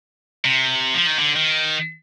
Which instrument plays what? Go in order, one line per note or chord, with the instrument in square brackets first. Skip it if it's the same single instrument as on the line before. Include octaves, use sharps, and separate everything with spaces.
[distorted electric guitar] C3
F3
D#3
D3
D#3